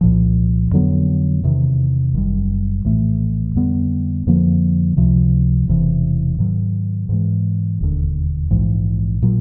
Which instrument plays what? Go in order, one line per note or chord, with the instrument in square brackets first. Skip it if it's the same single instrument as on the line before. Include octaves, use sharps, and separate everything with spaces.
[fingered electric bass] C2 A#2 F3
F2 D3 F#3 B3
E2 C3 D#3
F#1 F#2 D#3 G3
A#1 A2 E3 A3
F2 D3 G3 B3
F2 D3 F3 A#3
C#2 C3 F3
E1 E2 C3 E3
G#2 D#3 F#3
G#2 E3 G#3
E1 D#2 D3
A#1 G#2 E3
A#2 F#3